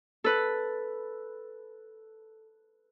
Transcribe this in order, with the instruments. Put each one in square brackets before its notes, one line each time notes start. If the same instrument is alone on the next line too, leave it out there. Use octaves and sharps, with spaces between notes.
[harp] A4 B4